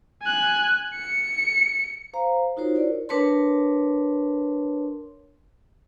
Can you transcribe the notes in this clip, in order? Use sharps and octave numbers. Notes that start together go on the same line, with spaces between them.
G#5 F#6
C#7
C5 F5 A#5
D#4 F4 F#4 A#4 C5 C#5
E4 F#4 A#4 C#5 D5
D4 A#4 B4 C#5 A5 C6